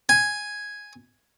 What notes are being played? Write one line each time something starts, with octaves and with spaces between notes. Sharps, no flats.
G#5